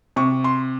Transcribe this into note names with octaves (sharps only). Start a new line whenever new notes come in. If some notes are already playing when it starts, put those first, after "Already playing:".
C3 C#6
C6